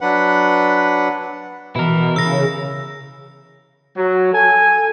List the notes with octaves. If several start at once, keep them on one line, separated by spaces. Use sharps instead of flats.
F#3 D4 B4 F#5
B2 E3 E4 A#4
C#3 E6 A#6
F#3
A4 G#5